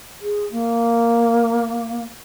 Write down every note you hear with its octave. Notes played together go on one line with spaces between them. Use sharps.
G#4
A#3